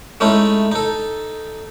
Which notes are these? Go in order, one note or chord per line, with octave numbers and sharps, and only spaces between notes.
G#3 A3 C#4 D#4 E4 A4
D#4 A4